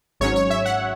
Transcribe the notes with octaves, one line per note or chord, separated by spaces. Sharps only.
G#1 G#2 F#3 C#4 C#5
C#5
E5
F#5